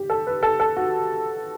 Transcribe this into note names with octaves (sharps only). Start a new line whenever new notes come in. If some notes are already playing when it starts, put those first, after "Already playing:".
Already playing: G4
A4
B4
A4
A4
F#4